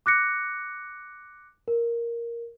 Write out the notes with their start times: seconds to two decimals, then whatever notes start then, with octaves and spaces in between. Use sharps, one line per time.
0.06 D6 F#6 A#6 C#7
1.68 A#4